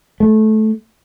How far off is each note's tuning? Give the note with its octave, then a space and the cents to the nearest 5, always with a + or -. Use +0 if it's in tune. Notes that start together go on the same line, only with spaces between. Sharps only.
A3 -20